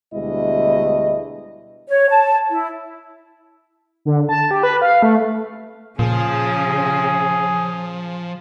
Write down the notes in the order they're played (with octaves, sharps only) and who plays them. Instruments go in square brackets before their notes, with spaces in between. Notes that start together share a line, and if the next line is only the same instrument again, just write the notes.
[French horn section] D2 B2 G3 G#3 E4 D#5
[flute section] C#5
A5
E4
[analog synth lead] D3
A5
G4
B4
F5
A3
[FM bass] A#2 [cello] C#3 [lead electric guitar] F3 [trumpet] G#4